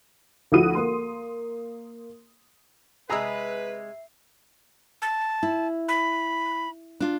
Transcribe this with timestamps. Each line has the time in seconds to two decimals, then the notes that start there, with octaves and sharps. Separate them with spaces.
0.52 D2 F3 E4 F#4 D#6 D#7
0.75 A#3 C6
3.10 C3 G#3 G#4 B4 E5 A#5 E6 C7
5.02 A5
5.43 E4
5.88 B5
7.00 D4 F4